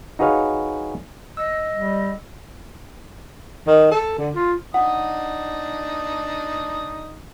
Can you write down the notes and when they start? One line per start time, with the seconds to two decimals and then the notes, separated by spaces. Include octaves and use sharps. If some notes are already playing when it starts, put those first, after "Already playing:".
0.19 D#4 F#4 G#4 B4 C#5 F5
1.37 D#5 E6
1.74 G3
3.67 D#3
3.91 A4
4.18 D3
4.35 F4
4.74 D4 D#4 F#5 D#6